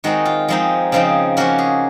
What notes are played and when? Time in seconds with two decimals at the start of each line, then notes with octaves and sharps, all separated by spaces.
0.04 D#3 G#3 C4 D#4 F#4
0.25 F4
0.48 F3 G#3 C4 D#4
0.92 C#3 F3 C4 D#4
1.37 F3 A#3 C#4 F#4
1.59 G#4